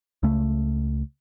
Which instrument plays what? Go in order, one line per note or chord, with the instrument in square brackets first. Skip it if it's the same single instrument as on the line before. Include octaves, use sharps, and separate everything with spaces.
[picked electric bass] C#2 C#3 A3